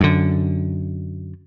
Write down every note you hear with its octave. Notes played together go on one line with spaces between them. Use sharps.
F#2 D3